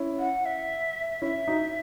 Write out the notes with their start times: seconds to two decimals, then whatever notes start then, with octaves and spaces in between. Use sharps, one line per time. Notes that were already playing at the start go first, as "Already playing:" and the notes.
Already playing: C#4 E4
0.18 F#5
0.45 E5
1.22 C#4 E4 E5
1.48 D#4 F#4